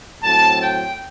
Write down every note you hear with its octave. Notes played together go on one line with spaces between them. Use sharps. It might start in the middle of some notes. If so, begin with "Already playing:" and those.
A2 F#3 C4 A5
G5